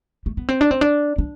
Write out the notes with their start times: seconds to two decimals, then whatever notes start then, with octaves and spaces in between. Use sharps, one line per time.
0.26 A3
0.37 B3
0.49 C4
0.61 D4
0.71 C4
0.81 D4
1.18 D4